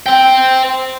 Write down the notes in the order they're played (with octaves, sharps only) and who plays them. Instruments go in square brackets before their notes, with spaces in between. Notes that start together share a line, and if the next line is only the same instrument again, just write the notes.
[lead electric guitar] C5 G5